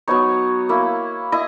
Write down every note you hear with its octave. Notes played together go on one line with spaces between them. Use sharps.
F#3 B3 D#4 C#5
A#3 E4
E4 D#5